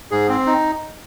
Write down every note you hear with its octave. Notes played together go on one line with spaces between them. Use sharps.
G#2 G#4
C4
D#4